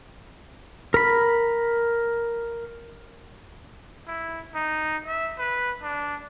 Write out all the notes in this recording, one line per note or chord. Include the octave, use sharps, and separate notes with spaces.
A#4 B5
E4
D#4
E5
B4
D4